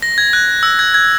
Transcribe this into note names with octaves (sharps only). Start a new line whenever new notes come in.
A#6
G#6
F#6
E6
G#6
G#6